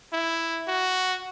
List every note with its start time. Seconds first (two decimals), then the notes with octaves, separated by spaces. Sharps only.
0.13 E4
0.68 F#4